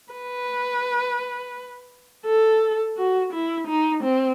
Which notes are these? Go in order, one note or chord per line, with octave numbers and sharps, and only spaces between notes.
B4
A4
F#4
E4
D#4
C4